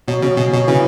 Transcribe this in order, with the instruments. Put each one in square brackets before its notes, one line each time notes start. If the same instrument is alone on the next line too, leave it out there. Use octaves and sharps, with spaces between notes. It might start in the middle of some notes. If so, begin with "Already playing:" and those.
[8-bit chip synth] B2 [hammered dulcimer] F#3
[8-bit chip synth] C#3 [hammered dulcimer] F#3
[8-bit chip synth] B2 [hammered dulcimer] G#4
[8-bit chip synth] B2 [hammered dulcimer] F#3
[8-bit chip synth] C#3 [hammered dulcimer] E3